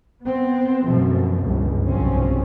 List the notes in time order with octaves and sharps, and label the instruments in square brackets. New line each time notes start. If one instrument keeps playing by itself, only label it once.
[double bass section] B3 C4
F#2 B2 F3 A3
G1 C#2
F1 B1 G2 F3 C4 C#4